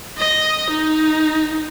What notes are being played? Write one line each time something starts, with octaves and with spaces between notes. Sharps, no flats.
D#5
D#4